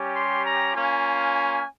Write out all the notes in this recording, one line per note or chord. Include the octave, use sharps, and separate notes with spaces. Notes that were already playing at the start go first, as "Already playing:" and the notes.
Already playing: G3 C#4 G4
C6
A#5
A#3 C#4 F4 G#5
G#5